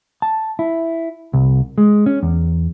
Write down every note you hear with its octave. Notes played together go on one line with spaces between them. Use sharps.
A5
E4
C2
G#3
C#4
E2